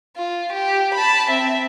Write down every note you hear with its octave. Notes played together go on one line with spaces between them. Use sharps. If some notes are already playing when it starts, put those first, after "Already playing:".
F4
G4
A5 B5
C4 E5